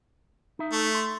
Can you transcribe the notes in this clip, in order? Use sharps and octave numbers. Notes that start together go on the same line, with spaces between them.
D#4 E5
A3
C6